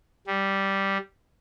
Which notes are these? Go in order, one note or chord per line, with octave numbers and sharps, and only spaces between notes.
G3